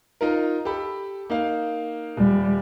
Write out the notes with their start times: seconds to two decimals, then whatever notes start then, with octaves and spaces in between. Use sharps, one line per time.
0.21 D#4 F4 A#4
0.65 G4 A4 B5
1.30 A#3 D#4 F5
2.17 D#1 G3